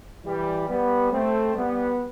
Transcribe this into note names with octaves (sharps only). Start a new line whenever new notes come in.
E3 G3
G3 B3
A3 C4
G3 B3